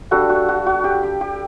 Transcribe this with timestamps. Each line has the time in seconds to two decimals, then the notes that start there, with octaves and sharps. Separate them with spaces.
0.11 G3 D4 F#4 A4
0.29 F#4
0.49 F#4
0.66 F#4
0.84 G4
1.03 G4
1.21 G4